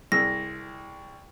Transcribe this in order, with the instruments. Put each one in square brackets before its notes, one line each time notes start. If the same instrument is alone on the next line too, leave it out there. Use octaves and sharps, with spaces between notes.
[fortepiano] C2 G#4 E6 [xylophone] A#6